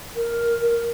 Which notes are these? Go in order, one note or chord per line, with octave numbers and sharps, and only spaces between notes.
A#4